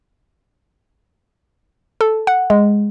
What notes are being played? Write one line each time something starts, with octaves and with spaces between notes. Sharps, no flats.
A4
F#5
G#3